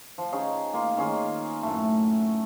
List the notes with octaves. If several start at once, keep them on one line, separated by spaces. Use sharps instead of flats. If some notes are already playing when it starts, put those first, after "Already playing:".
F3
C#4 D#4 G#4 C#5
A#3 F4
D#3 C#4 F4 G#4
F#2 A2 A3